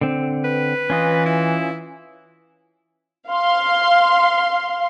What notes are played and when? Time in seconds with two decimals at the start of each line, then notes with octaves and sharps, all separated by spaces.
0.01 D3 C4
0.44 B4
0.90 E3 C#4 F4 D#5
1.26 E4
3.28 F5 C6